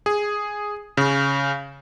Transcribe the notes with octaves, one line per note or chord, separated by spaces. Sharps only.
G#4
C#3